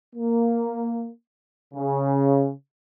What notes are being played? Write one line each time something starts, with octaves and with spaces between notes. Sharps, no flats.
A#3
C#3